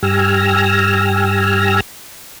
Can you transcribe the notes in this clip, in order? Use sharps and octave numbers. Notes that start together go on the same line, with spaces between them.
G2 G4 G#5 E6 F6 A#6